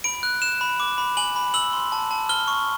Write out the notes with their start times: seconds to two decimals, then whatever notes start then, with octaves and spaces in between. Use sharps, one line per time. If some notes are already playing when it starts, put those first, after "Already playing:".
0.04 B5 D7
0.23 F#6
0.42 F#6 E7
0.61 B5
0.80 D6
0.98 B5
1.17 G#5 F#7
1.36 B5
1.54 E6 F#7
1.73 C6
1.92 A5
2.11 A5
2.29 F6 G7
2.48 C#6